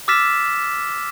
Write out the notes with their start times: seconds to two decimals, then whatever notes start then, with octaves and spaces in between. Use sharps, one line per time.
0.08 D6 E6 F6 A6 B6 E7